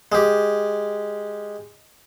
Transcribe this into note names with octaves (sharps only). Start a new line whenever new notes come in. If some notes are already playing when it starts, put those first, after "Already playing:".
G#3 G4